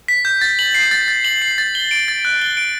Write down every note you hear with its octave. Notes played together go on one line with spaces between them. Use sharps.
B6
G6
A6
F#7
C7
A6
A6
F#7
C7
A6
G7
D7
A6
F#6
G7
D7